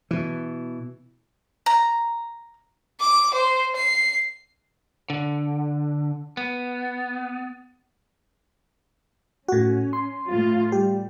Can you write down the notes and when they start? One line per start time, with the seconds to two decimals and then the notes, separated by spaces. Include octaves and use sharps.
0.11 B2 E3
1.66 A#5
3.00 D6
3.34 C5
3.76 C7
5.10 D3
6.37 B3
9.48 A2 C#4 F#4
9.93 C6
10.29 A2 F4
10.72 G3 G4